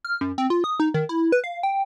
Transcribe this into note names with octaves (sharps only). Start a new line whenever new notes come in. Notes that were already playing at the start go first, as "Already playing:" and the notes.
F6
F#2
C4
F4
D#6
D#4
D#3
E4
B4
F5
G5